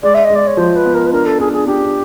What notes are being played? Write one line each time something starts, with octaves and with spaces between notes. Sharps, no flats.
G#3 D5
E5
D#5
G#3
D5
C#5
F3 C5
B4
B3
A#4
B4
D4 A#4
A4
D4 G#4
G#4
D4 G4